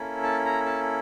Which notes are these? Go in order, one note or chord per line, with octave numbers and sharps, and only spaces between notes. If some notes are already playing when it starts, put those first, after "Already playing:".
Already playing: A#3 C#4 E4 A4
A5
A#5
A5